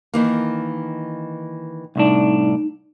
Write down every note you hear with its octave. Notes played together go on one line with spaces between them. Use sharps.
D#3 E3 A#3
C2 A2 D4 D#4